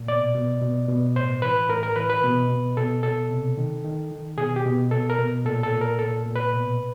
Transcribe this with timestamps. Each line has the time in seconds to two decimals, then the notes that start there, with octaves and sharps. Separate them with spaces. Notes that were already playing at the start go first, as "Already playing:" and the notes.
Already playing: A#2
0.08 B2 D5
0.34 B2
0.61 B2
0.88 B2
1.16 A2 C5
1.42 E3 B4
1.69 A2 A#4
1.83 A#4
1.96 E3 B4
2.10 B4
2.24 B2
2.49 B2
2.77 B2 A4
3.03 B2 A4
3.30 C3
3.57 D#3
3.85 D#3
4.11 D#3
4.37 B2 G#4
4.56 G4
4.65 B2
4.91 B2 A4
5.10 A#4
5.19 B2
5.45 A#2 A4
5.63 A4
5.72 A#2
5.81 A#4
5.99 A#2 A4
6.26 A#2
6.36 B4
6.53 B2